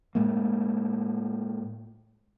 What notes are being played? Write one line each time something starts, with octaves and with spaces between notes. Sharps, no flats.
A2 G#3 A#3